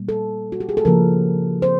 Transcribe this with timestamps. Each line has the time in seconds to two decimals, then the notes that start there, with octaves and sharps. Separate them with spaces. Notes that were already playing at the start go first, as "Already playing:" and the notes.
Already playing: A#2 G3 A#3
0.09 A4
0.52 F#4
0.60 G4
0.69 G#4
0.77 A4
0.85 C#3 F3 A#3 A#4
1.62 C5